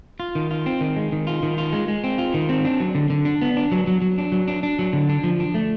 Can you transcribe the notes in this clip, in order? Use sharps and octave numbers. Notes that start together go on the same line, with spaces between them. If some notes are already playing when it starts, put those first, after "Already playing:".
F4
D#3
F4
C4
D#3
G#3
D#3
F4
D#3
F4
G#3
G#3
C4
F4
D#3
C4
D4
F#3
D3
D3
D4
B3
D4
F#3
F#3
F#3
D4
F#3
D4
D4
F#3
D3
D4
F3
D4
A3